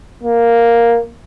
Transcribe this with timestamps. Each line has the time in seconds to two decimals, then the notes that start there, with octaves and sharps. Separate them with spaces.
0.23 A#3